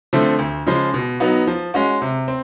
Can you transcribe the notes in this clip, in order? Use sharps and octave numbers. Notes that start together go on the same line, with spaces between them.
D3 F3 A3 C4
D2
C#3 F3 G#3
B2
F#3 B3 D#4
F3
G#3 C#4 F#4
C3
C4